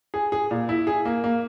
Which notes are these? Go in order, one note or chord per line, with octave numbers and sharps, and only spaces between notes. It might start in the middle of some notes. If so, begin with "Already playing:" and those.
G#4
G#4
A#2
E4
G#4
A#3
A#3